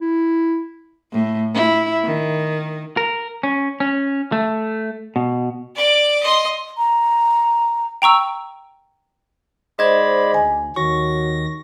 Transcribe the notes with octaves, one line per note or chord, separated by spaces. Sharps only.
E4
A2
E4
D#3
A#4
C#4
C#4
A3
B2
D5 D6
D#5 C6
A#5
G5 A#5 C#6 E6
G#2 C5 D5 D#5 B5 G#6
D2 G#5
D#2 D#3 F#3 C#6 A#6